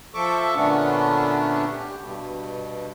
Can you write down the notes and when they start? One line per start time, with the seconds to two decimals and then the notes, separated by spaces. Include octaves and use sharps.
0.14 F3 A4 E5 C#6 D6
0.55 A#2 D3 A3 B3 C#4 D4
1.71 G4
1.99 G2 B2